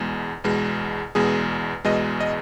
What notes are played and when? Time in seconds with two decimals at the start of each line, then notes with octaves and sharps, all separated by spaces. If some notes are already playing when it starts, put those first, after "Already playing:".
Already playing: E2 B2 G#3
0.44 E2 B2 G#3
1.15 E2 B2 G#3 G#4
1.85 E2 B2 G#3 D#5
2.20 D#5